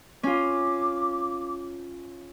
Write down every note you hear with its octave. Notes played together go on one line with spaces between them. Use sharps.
C#4 F4 D6